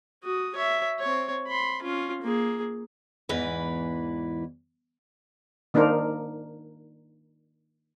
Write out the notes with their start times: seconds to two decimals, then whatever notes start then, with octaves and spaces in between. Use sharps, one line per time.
0.23 F#4 D#6
0.56 C#5 E5
0.99 C4 C#5
1.48 B5 C6
1.82 C#4 F4
2.22 A#3 G#4
3.29 E2 G#2 E3 B4
5.74 D#3 A#3 D4 D#4 A#4 C5